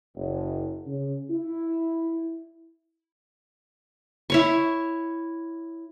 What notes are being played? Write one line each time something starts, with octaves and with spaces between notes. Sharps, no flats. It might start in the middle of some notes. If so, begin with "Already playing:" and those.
F#1
C#3
E4
E4 C#5 C#6